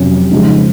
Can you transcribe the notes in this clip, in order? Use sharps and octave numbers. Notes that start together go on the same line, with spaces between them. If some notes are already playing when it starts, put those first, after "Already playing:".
Already playing: F2 C3 F#3 C#4
C#3 F3 G#3 D#4 G#4